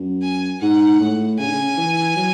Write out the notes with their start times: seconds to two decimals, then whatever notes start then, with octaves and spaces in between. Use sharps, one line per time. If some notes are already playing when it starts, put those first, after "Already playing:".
Already playing: F#2
0.23 G#5
0.61 G#2 F#5
1.00 A2
1.39 C#3 G#5
1.46 D3
1.52 C#3
1.77 E3
2.16 F#3